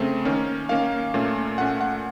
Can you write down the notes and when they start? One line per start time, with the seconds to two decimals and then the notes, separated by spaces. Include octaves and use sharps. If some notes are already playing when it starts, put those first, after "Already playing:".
Already playing: C#3 A3 C4
0.25 D#3 A#3 C#4
0.69 D#3 A#3 C#4 F5
1.14 A#2 A3 C#4
1.58 A#2 A3 C#4 F#5
1.81 F#5